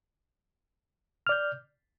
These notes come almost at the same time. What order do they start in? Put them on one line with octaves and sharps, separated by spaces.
F6 D5 G6